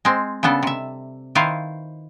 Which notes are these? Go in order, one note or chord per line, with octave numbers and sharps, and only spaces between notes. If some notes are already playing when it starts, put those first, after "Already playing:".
G#3 C4
C#3 G3 B3 D4 A4
C3 E5
D#3 E4 F4 B4 C5 F5